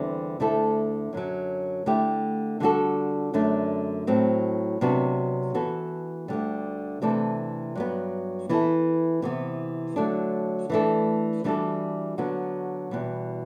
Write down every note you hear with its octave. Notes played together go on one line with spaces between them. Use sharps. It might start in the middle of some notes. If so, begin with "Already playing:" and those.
Already playing: E2 D3 G3 C4 E4
D2 D3 A3 E4 A4
F#2 D3 F#3
D3 A3 E4 G4
D3 G3 D4 F#4 A4
F#2 D3 A3 D4
A2 F#3 C4
C3 F#3 B3 D4 F#4
E3 B3 F#4 A4
D2 D3 G3
C3 E3 A3 D4 A4
G2 F#3 B3
E3 B3 E4 A4
C3 E3 B3
D3 F#3 A3 D4
E3 A3 D4 A4
E3 G3 D4 F#4 A4
D3 F#3 B3 F#4
E2 B2 G3